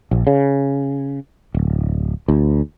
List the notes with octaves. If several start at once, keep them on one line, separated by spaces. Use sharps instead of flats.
A#1
C#3
D1
D2